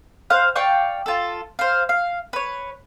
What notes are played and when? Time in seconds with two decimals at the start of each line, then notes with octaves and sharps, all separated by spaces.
0.30 C5 F5 F#6
0.56 D5 F5 G5 C#6
1.06 F4 A4
1.59 C5 F5
1.89 F5
2.33 B4 C#5